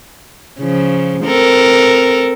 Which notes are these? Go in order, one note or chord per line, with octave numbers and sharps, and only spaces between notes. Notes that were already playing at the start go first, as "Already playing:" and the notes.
C#3 F3
C4 A4 A#4